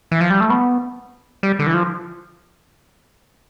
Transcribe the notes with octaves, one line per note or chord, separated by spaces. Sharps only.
E3
F3
G3
A3
B3
G3
D3
E3
F3